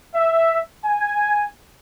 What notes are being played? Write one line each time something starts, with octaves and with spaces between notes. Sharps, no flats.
E5
G#5